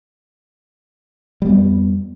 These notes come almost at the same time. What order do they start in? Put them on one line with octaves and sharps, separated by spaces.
G3 B3 F2